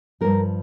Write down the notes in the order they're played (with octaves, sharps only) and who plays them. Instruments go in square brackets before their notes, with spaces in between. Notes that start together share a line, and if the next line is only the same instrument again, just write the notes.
[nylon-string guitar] G2 F3 A#4